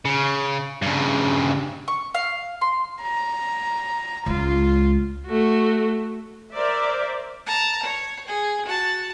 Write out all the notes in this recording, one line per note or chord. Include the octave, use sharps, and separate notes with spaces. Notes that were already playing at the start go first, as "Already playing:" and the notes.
C#3
G2 C#3
C#6
F5
C6
A#5
C#2 G#3 F4
A3 F#4
A#4 C5 D5 E5
A5 A#5
C#5
G#4
F#4 A5